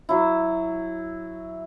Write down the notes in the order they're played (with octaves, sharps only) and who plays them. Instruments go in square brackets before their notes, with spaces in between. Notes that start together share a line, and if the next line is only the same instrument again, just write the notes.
[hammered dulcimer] F#3 E4